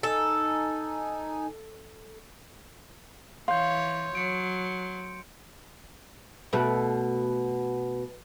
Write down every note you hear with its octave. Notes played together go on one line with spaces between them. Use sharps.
D#4 A4 G#5
E3 C#5 F5 C6 G6
F#3 C#7 D7
B2 A3